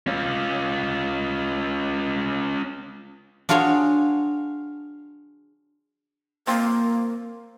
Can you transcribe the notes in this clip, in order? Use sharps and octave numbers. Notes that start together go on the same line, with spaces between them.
C#4 F4
D4 F4 F#4 G#4 C#5
F3 A#3 C4 F4